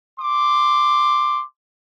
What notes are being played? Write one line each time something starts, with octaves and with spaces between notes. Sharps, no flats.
C6 D6